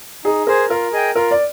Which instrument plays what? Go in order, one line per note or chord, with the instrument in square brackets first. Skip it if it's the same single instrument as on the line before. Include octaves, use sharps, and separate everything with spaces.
[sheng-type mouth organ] D#4 [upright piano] G#4
[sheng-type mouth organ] G#4 C5 [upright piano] A#4
[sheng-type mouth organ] F4 [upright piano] A#4
[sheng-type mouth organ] G#4 D#5 G5
[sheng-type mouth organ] F4 [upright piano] A#4
[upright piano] D5